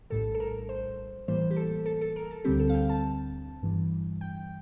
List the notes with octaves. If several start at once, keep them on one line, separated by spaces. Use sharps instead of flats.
A#1 A2 G3 A4
A4
A#4
C5
A2 E3 G3 A#3 C5
G4
A4
A4
A4
A#4
A4
D2 D3 G3 C4 G4
A4
F5
G5
A5
G1 G2 E3 G3
G5